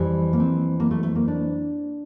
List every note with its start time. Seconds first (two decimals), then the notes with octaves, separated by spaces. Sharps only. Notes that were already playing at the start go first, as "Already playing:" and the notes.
Already playing: F2 E3 G3
0.33 A#3
0.40 C4
0.80 A#3
0.91 A3
1.03 A3
1.15 A#3
1.28 D4